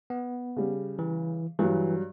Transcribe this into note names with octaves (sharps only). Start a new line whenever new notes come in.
B3
C#3 G3
E3
G2 E3 F#3